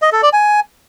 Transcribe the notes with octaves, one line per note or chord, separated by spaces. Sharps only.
D#5
A4
D5
G#5